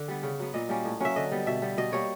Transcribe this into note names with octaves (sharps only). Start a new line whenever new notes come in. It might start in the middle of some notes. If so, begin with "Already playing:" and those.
Already playing: D3
G3 B3
C#3
F#3 B3
A#2 D#5
G3 A#3 C#4
A2
F#3 A#3 C#4 E5
D3 D#5
G3 B3
B2 E5
G3 B3
B2 D#5
G3 A#3 C#5